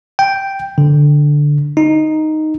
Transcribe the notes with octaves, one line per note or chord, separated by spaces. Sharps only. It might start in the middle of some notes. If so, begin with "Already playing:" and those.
G5
D3
D#4